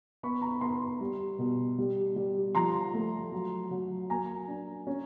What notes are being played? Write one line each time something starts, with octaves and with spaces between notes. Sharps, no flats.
B3 B5 C#6
A#5
B5
B3 A#5 C6
G3
B2
G3
G3
F3 A#5 C6
A3
F#3
F#3
A#3 G#5 A#5
D4
C#4